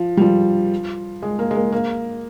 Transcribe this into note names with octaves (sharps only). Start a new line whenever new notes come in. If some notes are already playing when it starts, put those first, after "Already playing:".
Already playing: F3
G3
F3
G#3
A#3
G#3
A#3
A#3